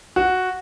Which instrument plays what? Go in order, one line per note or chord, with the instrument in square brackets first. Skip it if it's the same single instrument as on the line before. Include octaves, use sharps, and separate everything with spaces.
[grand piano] F#4